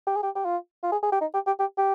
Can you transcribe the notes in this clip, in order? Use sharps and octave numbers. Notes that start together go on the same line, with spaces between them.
G4
G#4
G4
G4
F4
F4
G#4
G#4
G4
D#4
G4
G4
G4
G4